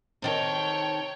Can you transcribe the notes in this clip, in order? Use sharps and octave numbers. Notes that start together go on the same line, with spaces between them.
C3 D#3 A4 C#5 G5